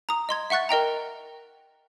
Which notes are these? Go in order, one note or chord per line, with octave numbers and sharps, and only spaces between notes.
A#5 D#6
D#5 C6 G#6
E5 F#5 C#6 F#6 A6
A#4 D#5 G5 A#5